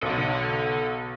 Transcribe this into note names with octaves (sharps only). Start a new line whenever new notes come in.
B1 A4 F#5